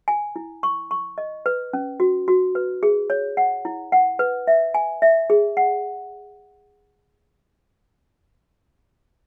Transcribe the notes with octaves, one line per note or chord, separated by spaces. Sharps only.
G#5
E4
C#6
C#6
D#5
B4
C#4
F#4
F#4
B4
G#4
C#5
F#5
E4
F#5
B4
E5
G#5
E5
G#4
F#5